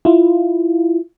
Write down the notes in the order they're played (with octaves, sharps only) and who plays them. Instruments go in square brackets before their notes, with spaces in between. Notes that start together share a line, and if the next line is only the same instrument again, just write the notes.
[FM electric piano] E4 F4